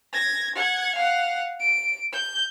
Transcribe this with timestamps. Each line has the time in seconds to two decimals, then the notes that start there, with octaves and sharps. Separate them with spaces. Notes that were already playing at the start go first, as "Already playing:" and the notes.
0.13 G#6 A#6
0.55 F#5 G#6
0.95 F5 F#5
1.60 D7
2.13 G6